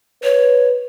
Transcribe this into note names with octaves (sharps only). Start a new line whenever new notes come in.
B4 C#5